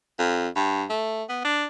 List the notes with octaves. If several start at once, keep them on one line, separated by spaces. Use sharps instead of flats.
F2
G2
A3
B3
D4